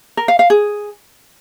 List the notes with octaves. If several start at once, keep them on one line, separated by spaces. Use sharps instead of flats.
A#4
F5
F5
G#4